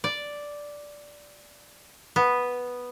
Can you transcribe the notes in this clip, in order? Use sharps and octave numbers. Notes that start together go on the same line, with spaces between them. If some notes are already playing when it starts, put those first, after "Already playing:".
D5
B3